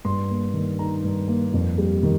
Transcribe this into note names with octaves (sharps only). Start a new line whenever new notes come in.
G2 C6
A#3
D#3
D#4 A#5
G2
A#3
F2
G3
D#3